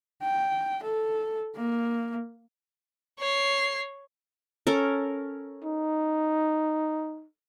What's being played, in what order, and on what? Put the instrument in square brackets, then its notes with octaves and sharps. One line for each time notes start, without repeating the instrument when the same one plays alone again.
[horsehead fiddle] G5
A4
A#3
[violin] C#5 C7
[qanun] C#4 A4 A#4
[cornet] D#4